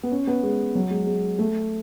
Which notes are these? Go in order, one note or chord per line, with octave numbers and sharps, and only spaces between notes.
B3
C#4
B3
G#3
F#3
G#3
G#3
A3